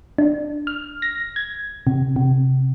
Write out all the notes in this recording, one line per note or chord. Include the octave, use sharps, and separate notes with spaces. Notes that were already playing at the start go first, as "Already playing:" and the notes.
D4
F6
A#6
G#6
C3
C3